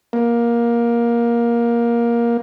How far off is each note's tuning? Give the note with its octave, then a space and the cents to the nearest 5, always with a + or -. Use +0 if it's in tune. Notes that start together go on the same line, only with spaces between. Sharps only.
A#3 +15